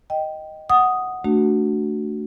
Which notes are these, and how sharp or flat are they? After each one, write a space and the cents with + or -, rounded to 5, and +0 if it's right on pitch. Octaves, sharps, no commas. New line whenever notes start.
D#5 +0 G5 -10
F#5 +0 D#6 +0
A3 +0 D4 +0 F#4 +5